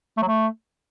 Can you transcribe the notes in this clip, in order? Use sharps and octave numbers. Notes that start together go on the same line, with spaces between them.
A3
F#3
A3